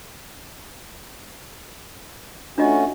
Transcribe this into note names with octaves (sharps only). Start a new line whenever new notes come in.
A3 C#4 D4 F4 F#4 D#5